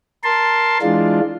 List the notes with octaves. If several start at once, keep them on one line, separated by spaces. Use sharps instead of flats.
A#4 A5 C6
E3 G#3 D4 F4